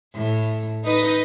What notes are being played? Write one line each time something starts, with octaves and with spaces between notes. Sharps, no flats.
A2
D#4 B4 D#5